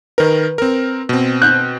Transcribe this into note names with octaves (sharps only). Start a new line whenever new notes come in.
D#3 A#4 B4
C4 A#4
B2 C4
F#6 G6